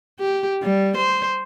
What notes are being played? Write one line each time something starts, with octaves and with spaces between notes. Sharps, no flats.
G4
G3
C5